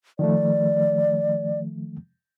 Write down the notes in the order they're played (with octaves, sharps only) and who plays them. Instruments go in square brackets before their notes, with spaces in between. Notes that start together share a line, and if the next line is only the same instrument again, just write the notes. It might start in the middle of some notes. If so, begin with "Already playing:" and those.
[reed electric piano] D#3 F3 A3 [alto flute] D5